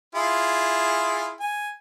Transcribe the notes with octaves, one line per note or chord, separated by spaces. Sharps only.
E4 F4 G#4
G#5